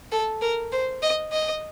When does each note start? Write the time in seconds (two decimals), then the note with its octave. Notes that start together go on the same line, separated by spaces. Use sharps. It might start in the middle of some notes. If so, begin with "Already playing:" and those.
0.12 A4
0.42 A#4
0.72 C5
1.03 D#5
1.32 D#5